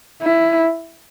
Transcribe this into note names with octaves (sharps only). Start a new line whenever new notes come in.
E4